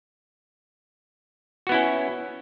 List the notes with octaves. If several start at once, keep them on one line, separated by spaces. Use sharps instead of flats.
B3 C#4 E4 F#4